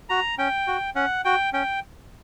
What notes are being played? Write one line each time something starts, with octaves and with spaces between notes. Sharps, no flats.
F#4 A#5
C#4 G5
F#4
C#4 F#5
F#4 G5
C#4 G5